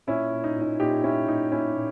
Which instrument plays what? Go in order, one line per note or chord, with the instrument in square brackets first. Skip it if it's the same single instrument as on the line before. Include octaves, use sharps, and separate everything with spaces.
[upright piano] A#2 C#4 E4
A#2
D#4
A#2
D#4
A#2 D#4 G4
A#2 C#4 E4
A#2 D#4
A#2 C#4 E4
A#2